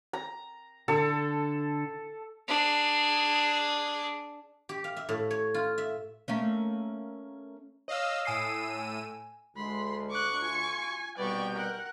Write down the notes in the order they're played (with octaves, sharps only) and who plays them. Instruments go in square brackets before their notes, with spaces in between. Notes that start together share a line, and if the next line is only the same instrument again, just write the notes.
[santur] A#5
[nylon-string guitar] D3 [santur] A4
[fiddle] D4 G#4
[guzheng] G4
F5
E5
A2
C#5
F4
E5
[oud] A3 A#3 C#4
[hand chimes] C#5 F6 [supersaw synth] D#5 F5 E6
[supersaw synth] A2 E6 D#7 [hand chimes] G#5 D#6 C7
[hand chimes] G#5
[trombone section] D2 [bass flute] G#3 [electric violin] B5 C6
[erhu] C#6 [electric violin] D6 F#6
[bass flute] F4 [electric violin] G#5
[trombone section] C2 B2 B4 [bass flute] G3 [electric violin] D5 C#6 [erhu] G5
[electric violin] A#4 F#5